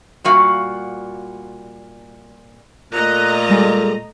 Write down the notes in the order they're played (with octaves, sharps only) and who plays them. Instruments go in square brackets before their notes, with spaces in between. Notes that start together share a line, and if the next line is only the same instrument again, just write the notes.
[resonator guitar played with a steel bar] A#2 G3 F#4 F5
[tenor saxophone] A#2 [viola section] A3 D#5 A#5 [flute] F#6
[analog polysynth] G3 G#3 [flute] A4